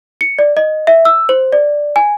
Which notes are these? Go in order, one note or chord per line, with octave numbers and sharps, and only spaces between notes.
C#7
D5
D#5
E5
E6
C5
D5
G#5